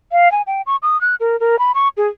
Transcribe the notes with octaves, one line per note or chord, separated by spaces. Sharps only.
F5
G#5
G5
C#6
D#6
F#6
A#4
A#4
B5
C#6
G#4